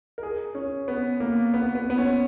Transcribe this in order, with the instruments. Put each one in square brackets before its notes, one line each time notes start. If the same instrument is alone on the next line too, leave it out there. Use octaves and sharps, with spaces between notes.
[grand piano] A#4
G#4
C#4
B3
A#3
B3
B3
B3
C#4